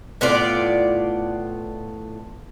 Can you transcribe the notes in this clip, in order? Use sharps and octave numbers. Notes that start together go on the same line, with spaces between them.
A2 B3 F4 D5